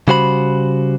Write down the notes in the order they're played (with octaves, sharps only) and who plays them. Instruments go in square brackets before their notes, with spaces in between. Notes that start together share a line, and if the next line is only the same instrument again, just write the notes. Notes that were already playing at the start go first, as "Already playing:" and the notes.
[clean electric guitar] C#3 G3 F#4 C5 F#5 B5